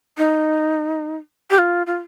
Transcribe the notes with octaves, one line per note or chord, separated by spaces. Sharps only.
D#4
G4
F4
F4